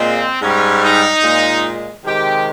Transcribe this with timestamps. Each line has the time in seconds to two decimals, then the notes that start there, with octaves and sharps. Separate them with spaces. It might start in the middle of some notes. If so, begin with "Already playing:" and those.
Already playing: A#2 G#3 C4
0.41 G#2 G3 C#4
0.82 D#4
1.23 A#2 G#3
2.03 C3 D#3 G#3 G4